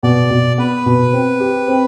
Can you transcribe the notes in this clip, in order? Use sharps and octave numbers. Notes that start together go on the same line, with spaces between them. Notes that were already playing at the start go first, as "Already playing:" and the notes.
B2 D5
B2
B3 B4
B2
C4
G4
C4